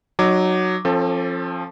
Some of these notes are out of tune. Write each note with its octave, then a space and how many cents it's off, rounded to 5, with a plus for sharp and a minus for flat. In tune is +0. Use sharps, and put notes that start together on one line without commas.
F#3 +0 D#4 -20 D6 +0
F3 +0 C4 +45 A4 +15